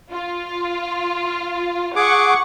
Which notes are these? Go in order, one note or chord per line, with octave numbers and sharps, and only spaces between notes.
F4
G#4 F#5 C#6 D6